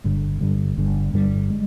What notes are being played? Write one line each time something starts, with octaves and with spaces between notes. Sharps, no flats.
G1 G2 D3 G3
G1 G2 D3 G3
G1 G2 D3 G3
G1 G2 D3 G3
G#3